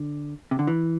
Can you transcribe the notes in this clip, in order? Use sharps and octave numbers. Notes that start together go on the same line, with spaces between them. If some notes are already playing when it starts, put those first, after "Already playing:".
Already playing: D3
C3
D3
E3